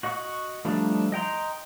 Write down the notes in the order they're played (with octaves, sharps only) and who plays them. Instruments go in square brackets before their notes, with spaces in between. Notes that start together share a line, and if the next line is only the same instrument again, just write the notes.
[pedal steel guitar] F#4 D#5 F#5 C#6
F3 G3 A3 D4 D#4
D#5 G5 A#5 C6